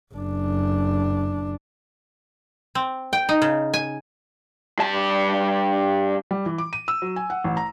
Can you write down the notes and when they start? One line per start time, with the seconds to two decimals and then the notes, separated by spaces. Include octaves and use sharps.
0.15 F#1 D4
2.75 C4
3.13 G5
3.29 D#4
3.42 C#3
3.74 G#5
4.78 G2 A5
6.31 G3
6.46 E3
6.58 D6
6.73 D#7
6.88 E6
7.02 F#3
7.16 G#5
7.30 F#5
7.44 A1
7.57 A#5